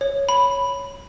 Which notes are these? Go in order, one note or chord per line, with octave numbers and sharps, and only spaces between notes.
C#5
B5